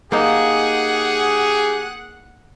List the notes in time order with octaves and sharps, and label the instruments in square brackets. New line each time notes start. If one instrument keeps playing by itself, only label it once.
[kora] A#3 D#4 [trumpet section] G4 G#4 [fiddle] F#5